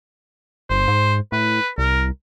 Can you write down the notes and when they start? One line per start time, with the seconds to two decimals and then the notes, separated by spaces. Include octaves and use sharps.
0.70 G1 C5
0.88 G#2
1.32 A2 B4
1.78 C2 A#4